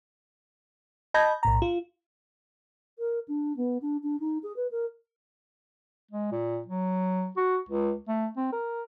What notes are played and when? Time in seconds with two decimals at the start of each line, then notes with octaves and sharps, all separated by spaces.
1.14 D#5 A5 B5 G6 G#6 A#6
1.43 B1 A2 A#5
1.62 F4
2.99 A#4
3.28 D4
3.57 B3
3.82 D4
4.03 D4
4.20 D#4
4.43 G#4
4.56 B4
4.71 A#4
6.11 G#3
6.32 A#2
6.66 F#3
7.37 F#4
7.69 C#2
8.08 A3
8.37 C4
8.52 A#4